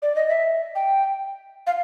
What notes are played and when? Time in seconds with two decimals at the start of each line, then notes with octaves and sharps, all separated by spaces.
0.02 D5
0.15 D#5
0.29 E5
0.75 G5
1.67 F5